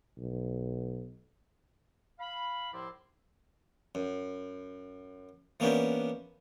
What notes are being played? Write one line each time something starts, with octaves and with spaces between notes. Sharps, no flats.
B1
F5 B5
C2 A2 F3 E4 D5 C6
F#2
E3 A#3 B3 C#4 D4 G4